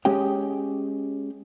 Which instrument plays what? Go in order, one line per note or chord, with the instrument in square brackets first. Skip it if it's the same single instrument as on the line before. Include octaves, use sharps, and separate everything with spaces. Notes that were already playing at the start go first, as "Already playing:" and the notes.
[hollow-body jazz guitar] G#3 C#4 G4 G#4 G5